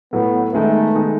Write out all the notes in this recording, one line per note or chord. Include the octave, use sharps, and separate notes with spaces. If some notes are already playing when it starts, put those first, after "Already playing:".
A2 F#3 A3 B3
D#3 G#3 A3 B3 D#4
D#3 G#3 B3 D#4